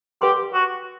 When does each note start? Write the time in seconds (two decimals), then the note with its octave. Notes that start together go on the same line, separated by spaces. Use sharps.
0.22 G4 B4 F#5 C6
0.54 F#4